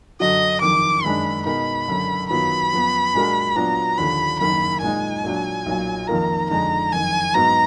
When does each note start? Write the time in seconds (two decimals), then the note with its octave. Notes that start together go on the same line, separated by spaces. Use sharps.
0.20 F#2 D3 F#3 D4 F#4 D#5
0.61 F#1 F2 D#3 D6
1.03 F#1 F#2 D#3 G#3 D4 B5
1.45 B2 G#3 D#4 A#4 B5
1.88 F#1 F#2 D3
2.30 F#2 D#3 F#3 B3 F4 B5
2.73 F#2 F3 B3
3.14 A#2 G#3 D4 F#4 A#4
3.55 A#2 F#3 B3 D4 F4 A#5
3.98 D#2 D3 F3 B5
4.39 F#1 F#2 D#3 A#3 B5
4.81 A#2 G#3 D#4 G#5
5.24 A#2 F#3 D4
5.66 B1 A#2 F#3
6.08 F2 D#3 A#3 F4 A#4 A#5
6.50 F2 D3 G#3 D#4 A#5
6.92 F#1 F2 D#3 G#5
7.35 G#2 F#3 B3 D#4 F#4 A#5